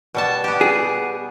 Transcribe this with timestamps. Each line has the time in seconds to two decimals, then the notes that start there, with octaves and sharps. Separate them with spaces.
0.14 B2 G3 A5
0.44 B3 G4
0.61 G#4